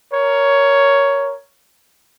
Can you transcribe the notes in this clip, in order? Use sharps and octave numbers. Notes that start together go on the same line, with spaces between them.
A#4 C#5